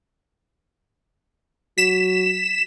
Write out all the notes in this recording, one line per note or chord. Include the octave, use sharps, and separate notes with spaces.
F#3 B6 E7